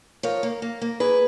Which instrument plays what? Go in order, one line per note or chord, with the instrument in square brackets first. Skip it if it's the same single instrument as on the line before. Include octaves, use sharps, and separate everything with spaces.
[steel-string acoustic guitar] F3 A#4 C#5
A#3
A#3
A#3
A#3 G#4 B4